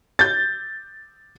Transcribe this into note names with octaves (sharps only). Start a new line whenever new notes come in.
G6 A6